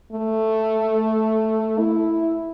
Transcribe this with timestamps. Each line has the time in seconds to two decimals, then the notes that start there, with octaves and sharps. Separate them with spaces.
0.13 A3
1.79 E4